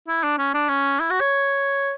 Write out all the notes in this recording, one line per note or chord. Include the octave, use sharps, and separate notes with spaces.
E4
D4
C#4
D4
C#4
E4
F#4
C#5